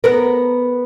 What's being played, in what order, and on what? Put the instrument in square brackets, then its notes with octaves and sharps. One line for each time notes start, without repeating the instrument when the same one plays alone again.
[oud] B3 A#4